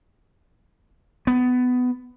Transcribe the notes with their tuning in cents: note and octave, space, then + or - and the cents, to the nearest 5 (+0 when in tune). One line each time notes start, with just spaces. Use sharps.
B3 +15